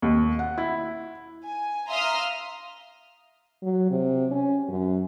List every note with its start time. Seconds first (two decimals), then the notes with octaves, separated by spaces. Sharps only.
0.02 D#2
0.39 F#5
0.58 E4
1.45 G#5
1.89 E5 F5 A#5 C6 D#6 F6
3.62 F#3
3.91 C3
4.31 C#4
4.68 F#2